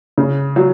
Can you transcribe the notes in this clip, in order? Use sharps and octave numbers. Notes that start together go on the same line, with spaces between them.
C#3
F#3